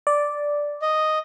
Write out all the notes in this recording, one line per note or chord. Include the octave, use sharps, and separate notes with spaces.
D5
D#5